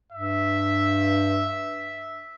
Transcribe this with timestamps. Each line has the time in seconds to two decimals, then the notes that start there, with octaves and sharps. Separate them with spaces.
0.12 G2 E5